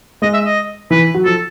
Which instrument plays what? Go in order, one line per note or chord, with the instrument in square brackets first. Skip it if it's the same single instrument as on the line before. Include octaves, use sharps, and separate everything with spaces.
[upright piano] G#3 [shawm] D#5
[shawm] E5
D#5
[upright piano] E3 [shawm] B4
[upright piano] F#3
[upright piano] F3 [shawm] A4